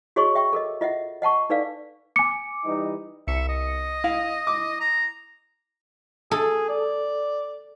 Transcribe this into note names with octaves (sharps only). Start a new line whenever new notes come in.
F#4 G#4 C#5 D#5 C6 C#6
E5 G5 C#6
A4 A#4 D#5
F4 D#5 E5 F#5
D#5 F#5 A5 C#6
D#4 A4 B4 D5 F5
G#5 D6 C#7
E3 G3 D#4
C2 E5 C#7
D#5
E4 F5
D6
A#5
G#4 A4
D5